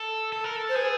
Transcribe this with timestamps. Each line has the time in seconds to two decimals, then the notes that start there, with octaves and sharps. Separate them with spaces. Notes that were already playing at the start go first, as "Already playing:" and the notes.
Already playing: A4
0.33 A4
0.44 A#4
0.56 A4
0.69 C5
0.76 G#4 B4